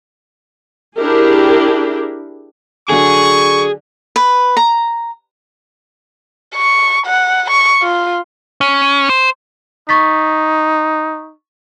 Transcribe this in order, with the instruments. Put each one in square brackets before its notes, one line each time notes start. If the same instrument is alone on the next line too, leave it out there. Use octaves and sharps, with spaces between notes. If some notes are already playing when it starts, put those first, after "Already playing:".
[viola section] D4 E4 G4 G#4 A#4
[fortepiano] D3 F#3 D4 [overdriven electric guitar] G#4 [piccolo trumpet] C#6
[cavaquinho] B4
A#5
[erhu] C#6
F#5
C#6
F4
[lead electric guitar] C#4
C5
[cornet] D#4 [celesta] C#6 A6 B6